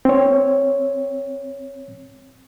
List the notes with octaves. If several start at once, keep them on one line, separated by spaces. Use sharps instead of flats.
C4 C#5